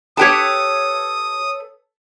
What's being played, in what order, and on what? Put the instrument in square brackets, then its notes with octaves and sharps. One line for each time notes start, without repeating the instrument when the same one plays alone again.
[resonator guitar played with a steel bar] G4 G5 A5 [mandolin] A4 B4 C#5 [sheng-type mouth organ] D#6